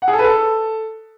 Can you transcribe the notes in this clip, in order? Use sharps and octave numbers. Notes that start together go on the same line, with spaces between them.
F#5
G#4
A4
B4
A4